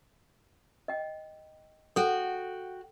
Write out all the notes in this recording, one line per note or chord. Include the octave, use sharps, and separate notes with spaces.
D#5 G5
F#4 A4 G5